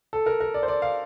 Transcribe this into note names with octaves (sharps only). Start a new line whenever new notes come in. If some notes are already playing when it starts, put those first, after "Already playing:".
A4
A#4
A#4
D5
C5
D5
F5